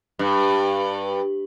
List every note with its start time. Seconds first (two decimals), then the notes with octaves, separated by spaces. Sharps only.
0.19 G2